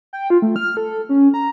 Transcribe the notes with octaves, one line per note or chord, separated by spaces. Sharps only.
G5
F4
A3
F6
A4
C#4
A#5